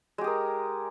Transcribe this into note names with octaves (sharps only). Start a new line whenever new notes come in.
G#3 G4 G#4 A#4